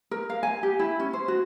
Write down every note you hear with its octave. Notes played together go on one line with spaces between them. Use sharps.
A#4
F5
G#5
G4
E4
C#4
C5
F#4